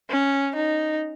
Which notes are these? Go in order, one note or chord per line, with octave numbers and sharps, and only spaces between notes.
C#4
D#4